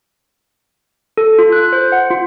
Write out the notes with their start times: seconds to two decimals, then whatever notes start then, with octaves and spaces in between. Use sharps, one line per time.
1.17 A4
1.39 F4
1.52 F#6
1.73 C5
1.92 F#5
2.10 F4